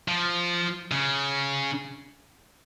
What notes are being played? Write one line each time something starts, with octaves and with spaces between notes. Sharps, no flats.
F3
C#3